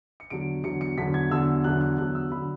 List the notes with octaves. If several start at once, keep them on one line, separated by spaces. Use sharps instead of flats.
C#7
E2 D3 F#3 D7
E2 D3 F#3 C#7
C#7
E2 D3 F#3 B6
G#6
E2 D3 F#3 E6
E2 D3 F#3 F#6
F#6
E2 D3 F#3 F#6
E6
D3 F#3 B5